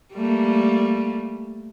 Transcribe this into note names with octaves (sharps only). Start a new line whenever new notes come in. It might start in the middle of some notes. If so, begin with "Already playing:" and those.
G3 A3 A#3